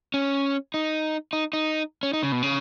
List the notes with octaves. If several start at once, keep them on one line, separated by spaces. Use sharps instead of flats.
C#4
D#4
D#4
D#4
C#4
D#4
C#3
B2
C#3